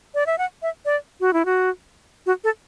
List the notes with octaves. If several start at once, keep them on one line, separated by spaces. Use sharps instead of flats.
D5
E5
F#5
E5
D5
F#4
E4
F#4
F#4
A4